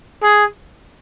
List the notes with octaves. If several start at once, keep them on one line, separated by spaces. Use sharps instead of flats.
G#4